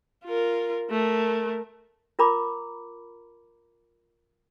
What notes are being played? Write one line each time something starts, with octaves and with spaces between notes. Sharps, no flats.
F4 A#4
A3 A#4
F4 A#4 A#5 B5 D6